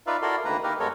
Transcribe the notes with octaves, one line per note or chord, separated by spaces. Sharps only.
D#4 F4 B4 D5 E5 F5
E4 F#4 A4 A#4 D5 C6
D2 D#3 A#3 B4 A#5
A#3 D#4 G4 A#4 B4
G2 G#3 B3 A4 A#4 C#5